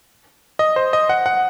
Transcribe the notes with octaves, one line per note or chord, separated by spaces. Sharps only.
D#5
C5
D#5
F#5
F#5